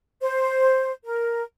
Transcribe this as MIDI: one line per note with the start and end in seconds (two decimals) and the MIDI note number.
0.21 0.91 72
1.04 1.41 70